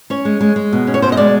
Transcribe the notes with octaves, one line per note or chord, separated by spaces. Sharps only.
C#4 C#5
G#3
G#3
G#3
B2
C#4
C#5
B2 C5
D#5
G#3 D5